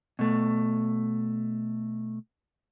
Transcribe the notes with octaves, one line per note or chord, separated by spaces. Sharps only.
B2 A3